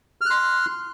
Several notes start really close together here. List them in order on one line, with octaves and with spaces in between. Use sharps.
F6 F#6 C6